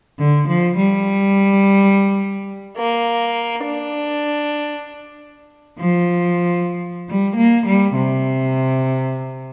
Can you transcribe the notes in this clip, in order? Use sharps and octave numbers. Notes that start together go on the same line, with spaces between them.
D3
F3
G3
A#3
D4
F3
G3
A#3
G3
C3